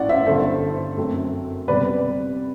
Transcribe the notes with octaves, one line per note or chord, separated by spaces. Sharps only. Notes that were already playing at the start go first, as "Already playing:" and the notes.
Already playing: A1 A2 E3 D5 F#5
C5 E5
G1 G2 D3 A4 C5
F#2 F#3 A3 C4
C3 G3 B3 B4 D5